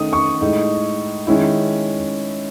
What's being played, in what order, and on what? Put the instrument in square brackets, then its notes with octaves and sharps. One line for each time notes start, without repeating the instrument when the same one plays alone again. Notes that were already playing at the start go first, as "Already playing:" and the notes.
Already playing: [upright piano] D#3 A3 D#4 D#6
C#6
A2 G#3 D#4
D#3 G#3 C#4 E4